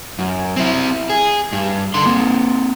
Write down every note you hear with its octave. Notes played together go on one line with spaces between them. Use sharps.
F#2
C4 E4
G#4
G2
D3 C6
A#3 C4